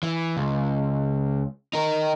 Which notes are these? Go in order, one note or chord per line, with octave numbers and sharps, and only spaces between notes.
E3
C#2
D#4 A#4